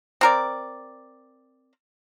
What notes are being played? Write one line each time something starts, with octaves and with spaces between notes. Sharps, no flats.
C4 A#4 D5